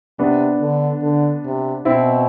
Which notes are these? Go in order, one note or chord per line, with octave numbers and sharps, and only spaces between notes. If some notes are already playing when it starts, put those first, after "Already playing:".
C3 B3 D4
D3
D3
C3
B2 C4 E4